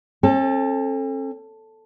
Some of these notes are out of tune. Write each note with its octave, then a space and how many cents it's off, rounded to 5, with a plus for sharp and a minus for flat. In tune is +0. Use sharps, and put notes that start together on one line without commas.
C4 +45 A4 +0